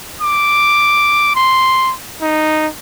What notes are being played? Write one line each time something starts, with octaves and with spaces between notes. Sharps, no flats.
D6
C6
D#4